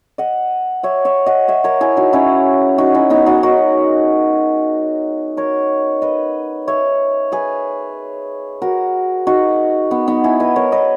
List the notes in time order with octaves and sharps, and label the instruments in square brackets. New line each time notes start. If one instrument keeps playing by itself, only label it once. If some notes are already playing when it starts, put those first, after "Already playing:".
[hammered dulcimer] D#5 F#5
C#5 E5
C#5 E5
D#5 F#5
C#5 E5
A#4 C#5
E4 G#4
D#4 F#4
C#4 E4
D#4 F#4
C#4 E4
B3 D#4
D#4 F#4
F#4 A#4
A#4 C#5
B4 D#5
C#5 E5
G#4 B4
F#4 A#4
D#4 F#4
B3 D#4
B3 D#4
E4 G#4
B4 D#5
A#4 C#5
B4 D#5